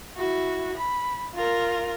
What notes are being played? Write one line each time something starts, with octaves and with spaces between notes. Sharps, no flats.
E4 F#4
B5
F4 A#4